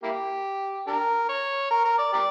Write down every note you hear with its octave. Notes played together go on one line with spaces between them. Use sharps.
A#3 E4 G4
D4 G4 A#4
C#5
A#4
A#4
D5
G4 A#4 D5